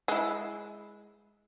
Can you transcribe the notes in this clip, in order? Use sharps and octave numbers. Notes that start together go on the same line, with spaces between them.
G#3 E4